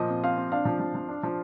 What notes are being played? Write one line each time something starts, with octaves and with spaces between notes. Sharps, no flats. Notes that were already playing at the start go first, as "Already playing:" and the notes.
Already playing: A#2 F3 D#5
C4
C4 F5
C4
D4 F5
F3
F3
F3
D4
F3